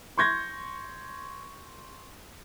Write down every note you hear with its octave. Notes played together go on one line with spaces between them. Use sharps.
C6 C#6 G6 G#6 A#6